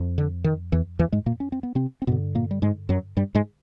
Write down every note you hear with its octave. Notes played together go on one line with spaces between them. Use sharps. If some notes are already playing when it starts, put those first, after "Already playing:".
Already playing: F2
D3
D#3
E2 E3
E2 E3
G#2 G#3
A#2 A#3
C#4
C4
B3
C3 C4
C4
G2 B2 D3 B3
A#2 A#3
G3
G#2 G#3
F#2 F#3
G2 G3
G#2 G#3